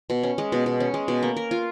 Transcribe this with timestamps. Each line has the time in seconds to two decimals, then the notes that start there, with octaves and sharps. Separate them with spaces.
0.10 B2
0.23 C#4
0.38 G#3
0.52 B2
0.66 B2
0.80 C#4
0.94 G#3
1.08 B2
1.23 A#3
1.37 A#4
1.51 F4